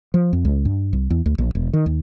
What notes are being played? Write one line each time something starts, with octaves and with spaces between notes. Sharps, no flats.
F3
F2
C#2
G2
C2
E2
D2
A#1
E1
D#3
D#2